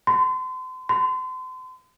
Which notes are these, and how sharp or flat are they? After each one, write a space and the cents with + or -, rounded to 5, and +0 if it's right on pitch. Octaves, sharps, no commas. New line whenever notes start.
C6 -35
C6 -35